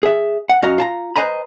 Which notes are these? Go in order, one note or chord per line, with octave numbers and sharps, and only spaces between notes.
G#4 E5
F#5
F#2 C#4 F#4 D#5 F5 A#5
F4 A5 A#5
B4 C5 D#5 G#5 A#5 B5